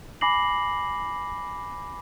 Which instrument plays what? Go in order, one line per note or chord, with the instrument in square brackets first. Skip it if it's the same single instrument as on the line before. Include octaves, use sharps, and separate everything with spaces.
[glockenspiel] G#5 B5 D6 A#6 C7 F#7